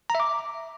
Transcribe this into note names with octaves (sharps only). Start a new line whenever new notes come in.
A#5
E5
D6